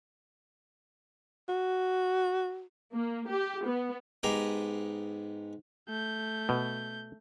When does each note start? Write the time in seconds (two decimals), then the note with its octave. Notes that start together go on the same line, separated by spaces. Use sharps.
1.49 F#4
2.93 A#3
3.29 G4
3.65 B3
4.23 G#2 B3 G4 G#4 A#5
5.88 A3 G6
6.49 B2